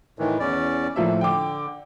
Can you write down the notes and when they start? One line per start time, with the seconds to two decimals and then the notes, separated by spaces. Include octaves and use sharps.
0.19 A2 D#3 E3
0.40 E2 C#4 D5
0.96 A2 F3 A#3 E5
1.21 D3 G5 D6